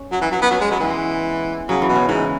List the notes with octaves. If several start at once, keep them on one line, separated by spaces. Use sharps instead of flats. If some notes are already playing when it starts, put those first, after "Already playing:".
Already playing: C#4
F#3
E3
F#3
B3
F#3 C#4
G#3
F#3 B3
E3
G#3
C#3 F#3
E3
B2
C#3
G#2 E3